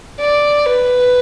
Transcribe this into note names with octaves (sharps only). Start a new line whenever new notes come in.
D5
B4